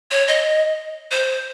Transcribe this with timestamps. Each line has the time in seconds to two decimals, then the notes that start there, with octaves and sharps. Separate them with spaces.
0.11 C#5
0.28 D#5
1.11 C5